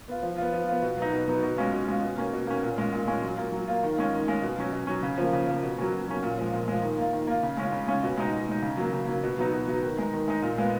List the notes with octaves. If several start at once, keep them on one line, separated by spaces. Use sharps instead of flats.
B3 F4
F3
B3 F4
F3
B3 F4
B2
F#3 B3 D#4
B2
F#3 B3 D#4
B2
G#3 C#4 F4
B2
G#3 C#4 F4
B2
A#3 C#4
B2
A#3 C#4
A#2
G#3 C#4 F4
A#2
G#3 C#4 F4
F#3
A#3 F4
F#3
A#3 F4
D#3
G#3 C#4 F4
D#3
G#3 C#4 F4
B2
F#3 C#4
B2
F#3 C#4
C#3
F3 A#3
C#3
F3 A#3
B2
F#3 A#3 C#4
B2
F#3 A#3 C#4
A#2
F3 G#3
A#2
F3 G#3
D#3
A#3 F4
D#3
A#3 F4
C#3
G#3 C#4 F4
C#3
G#3 C#4 F4
B2
G#3 D#4
B2
G#3 D#4
C#3
F#3 A#3
C#3
F#3 A#3
B2
F#3 B3 D#4
B2
F#3 B3 D#4
D#3
G#3 D#4
D#3
G#3 D#4
A#2
G#3 B3 F4